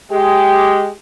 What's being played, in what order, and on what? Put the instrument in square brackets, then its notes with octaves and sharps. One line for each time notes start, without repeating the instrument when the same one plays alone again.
[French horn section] G#3 G4